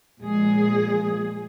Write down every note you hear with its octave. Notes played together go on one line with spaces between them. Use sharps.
A#2 F3 G#3 G#4